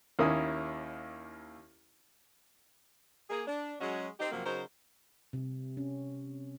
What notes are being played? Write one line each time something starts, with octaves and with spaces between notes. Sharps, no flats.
D#2 A#3 C#4 E4 D#6
A#3 G#4
D4
F#3 G#3 C#4 F#4 G#4 D#5
C4 D#4 G4
F#2 C3 F3 F#3 A#3
C#3 F#3 D#4 A#4 C5
C3
C#4